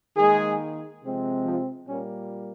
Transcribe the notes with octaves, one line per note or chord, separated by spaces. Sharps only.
D#3 G#3 A#3 G#4
C3 F3 G#3 C4
F3 F4
A#2 G3 A#3 C#4